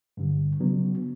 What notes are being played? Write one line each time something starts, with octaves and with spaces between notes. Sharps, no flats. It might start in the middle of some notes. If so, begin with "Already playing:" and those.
G2 D3 G3
C#3 F#3 B3 D4